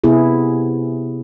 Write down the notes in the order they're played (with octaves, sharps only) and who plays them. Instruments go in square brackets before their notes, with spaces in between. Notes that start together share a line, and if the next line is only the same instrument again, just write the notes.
[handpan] C3 B3 E4 G#4